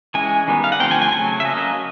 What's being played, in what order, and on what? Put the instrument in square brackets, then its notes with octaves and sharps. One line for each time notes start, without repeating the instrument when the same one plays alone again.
[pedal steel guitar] E3 G#3 C#4 G#5
D#3 G3 B3
F5
F#5
D3 F3 A3 C4 G5
G#5
G#5
C#3 F#3 A3 G#5
E5
F#3 A#3 C#4 D#5